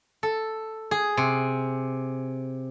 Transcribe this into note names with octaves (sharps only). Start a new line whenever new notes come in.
A4
G#4
C3